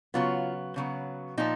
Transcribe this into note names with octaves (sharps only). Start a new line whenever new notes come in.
C#3 F#3 B3 F4
C#3 F#3 B3
A#2 F3 D#4